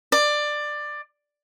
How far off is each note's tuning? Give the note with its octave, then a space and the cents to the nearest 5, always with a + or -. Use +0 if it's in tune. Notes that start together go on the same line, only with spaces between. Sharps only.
D5 +15